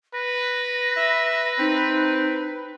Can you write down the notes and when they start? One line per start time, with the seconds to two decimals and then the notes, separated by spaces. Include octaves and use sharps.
0.14 B4 A#6
0.97 E5
1.59 C4 D#4